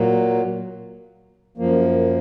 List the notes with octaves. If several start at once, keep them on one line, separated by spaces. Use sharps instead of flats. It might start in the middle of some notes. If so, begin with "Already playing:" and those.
Already playing: A#2 F#3 A#3
F#2 F3 A#3